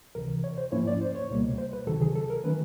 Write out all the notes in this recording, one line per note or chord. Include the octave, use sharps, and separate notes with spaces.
C#2 C3 E3 A#4
C#5
C5
G#2 F3 A#3 C#4 E4 C#5
D5
C5
C#5
C#2 B2 G3 A#3
C5
B4
C#2 C3 D#3 F#3 A4
G#4
A4
A#4
D#3 F#3 A3 C#4 B4